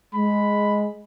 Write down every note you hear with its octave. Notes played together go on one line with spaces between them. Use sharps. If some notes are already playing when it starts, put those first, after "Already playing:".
G#3 B5